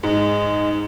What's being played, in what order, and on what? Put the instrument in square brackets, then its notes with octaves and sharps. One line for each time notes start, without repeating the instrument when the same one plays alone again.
[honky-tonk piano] G#2 [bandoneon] G#3